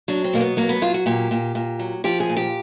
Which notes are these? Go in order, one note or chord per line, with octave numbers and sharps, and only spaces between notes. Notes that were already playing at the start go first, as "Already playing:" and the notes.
F#3 D4
C4
B2 A#3
B3
F#3 A#3
B3
F#3 F4
F#4
A#2 G4
A#2
A#2
F#3
F3 G4
G#4
A#2
G4